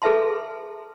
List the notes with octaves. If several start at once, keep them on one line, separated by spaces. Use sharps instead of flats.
G#4 A4 B4 E5 A5 C6